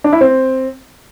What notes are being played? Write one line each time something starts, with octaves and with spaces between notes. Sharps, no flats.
D4
E4
C4